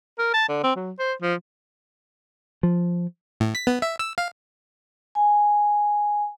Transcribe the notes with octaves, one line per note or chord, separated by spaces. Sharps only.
A#4
A5
D3
C4
F#3
C5
F3
F3
A2
B6
B3
E5
E6
F5
G#5